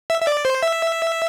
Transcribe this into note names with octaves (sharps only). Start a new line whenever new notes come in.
E5
E5
D5
C5
E5